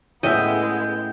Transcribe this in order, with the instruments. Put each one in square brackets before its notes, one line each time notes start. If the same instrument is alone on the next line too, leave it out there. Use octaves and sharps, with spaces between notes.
[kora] A2 C#4 E5 [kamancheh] G#3 B3 [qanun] D#5 [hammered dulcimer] G5